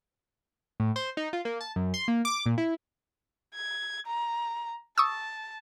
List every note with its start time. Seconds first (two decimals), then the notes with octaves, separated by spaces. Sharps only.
0.80 A2
0.96 C5
1.17 D#4
1.33 F4
1.45 A#3
1.61 A5
1.76 F#2
1.94 C6
2.08 A#3
2.25 D6
2.46 A#2
2.58 E4
3.55 G#6
4.06 A#5
4.98 A5 C#6 D#6 E6